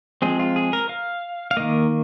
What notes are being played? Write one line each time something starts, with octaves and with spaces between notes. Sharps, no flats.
F3 G#3 C4 G#4
F4
G#4
A#4
F5
F5
D#3 A#3 D#5